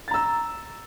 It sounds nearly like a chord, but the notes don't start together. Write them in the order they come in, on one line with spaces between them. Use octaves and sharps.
A6 A#5 E6